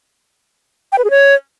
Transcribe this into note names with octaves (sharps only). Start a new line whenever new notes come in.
G5
B4
G#4
C#5